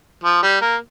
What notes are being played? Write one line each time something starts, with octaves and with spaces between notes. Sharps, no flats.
F3
G3
A#3